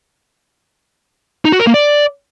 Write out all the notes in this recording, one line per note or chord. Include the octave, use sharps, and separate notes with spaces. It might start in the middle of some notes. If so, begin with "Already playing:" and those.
D#4
F#4
A#4
A#3
D5